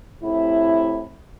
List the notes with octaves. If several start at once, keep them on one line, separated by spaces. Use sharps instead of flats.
A2 C3 E4